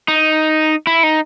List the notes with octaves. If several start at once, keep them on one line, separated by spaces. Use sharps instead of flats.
D#4
E4
D#4